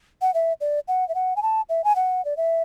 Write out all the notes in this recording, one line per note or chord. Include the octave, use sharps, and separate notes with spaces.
F#5
E5
D5
F#5
E5
F#5
G#5
A5
E5
G#5
F#5
D5
E5